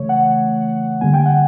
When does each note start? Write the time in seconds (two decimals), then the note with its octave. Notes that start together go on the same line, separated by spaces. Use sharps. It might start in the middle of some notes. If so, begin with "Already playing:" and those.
Already playing: C#3 E3 A3 C#5
0.09 F#5
1.01 D3 G3 A#3 G#5
1.14 G5
1.26 F#5